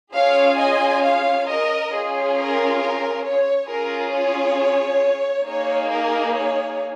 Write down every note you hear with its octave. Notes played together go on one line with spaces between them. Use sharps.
C#4 F4 G#4 C#5 F5
D#5 G#5
C#5 F5
A#4 D#5
C#4 F4 G#4
A#4
A#4
C#5
C#4 F4 G#4 A#4
C#5
A#3 D#4 G#4 C#5
A#4
C#5